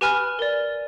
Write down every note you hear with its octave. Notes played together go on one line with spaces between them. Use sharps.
G4 B4 G#5 B5 F6
A#4 D5